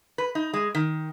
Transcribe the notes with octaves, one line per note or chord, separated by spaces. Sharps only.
B4
D#4
G#3
D#3